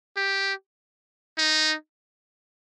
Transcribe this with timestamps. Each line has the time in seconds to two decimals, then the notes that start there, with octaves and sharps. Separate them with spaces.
0.16 G4
1.38 D#4